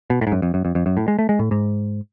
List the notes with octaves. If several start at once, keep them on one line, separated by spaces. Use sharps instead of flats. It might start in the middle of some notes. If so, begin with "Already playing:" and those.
B2
A2
G#2
F#2
F2
F#2
F2
F2
F#2
A2
G#3
A3
G#3
A2
G#2